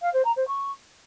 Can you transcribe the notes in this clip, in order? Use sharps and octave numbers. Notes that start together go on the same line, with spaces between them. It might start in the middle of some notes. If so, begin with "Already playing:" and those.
F5
C5
A#5
C5
C#6